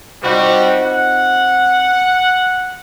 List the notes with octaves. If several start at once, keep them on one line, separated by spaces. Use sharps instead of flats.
G3 C4 D#4 F4 F#4
F#5